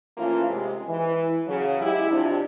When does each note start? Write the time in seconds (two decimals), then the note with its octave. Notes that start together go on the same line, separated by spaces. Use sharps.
0.17 A2 E3 F3 A#3 C#4 F4
0.49 C3 G#3
0.88 E3
1.47 C#3 F#3
1.81 G#3 E4 G4
2.11 C3 F3 D4